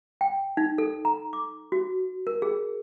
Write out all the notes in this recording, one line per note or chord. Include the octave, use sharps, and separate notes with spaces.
G5
D#4
A4
A#5
D6
F#4
A#4
G#4